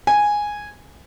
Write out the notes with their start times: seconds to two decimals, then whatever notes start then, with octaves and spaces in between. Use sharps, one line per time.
0.07 G#5